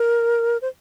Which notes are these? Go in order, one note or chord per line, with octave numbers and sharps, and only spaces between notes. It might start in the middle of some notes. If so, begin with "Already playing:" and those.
Already playing: A#4
C5